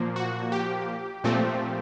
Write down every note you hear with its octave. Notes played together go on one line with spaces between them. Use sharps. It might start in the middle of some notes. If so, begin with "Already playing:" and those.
Already playing: A#2 F3 A#3
F#4
G4
A#2 F3 A3 C4